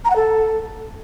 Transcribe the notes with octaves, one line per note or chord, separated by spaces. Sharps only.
A#5
F#5
A4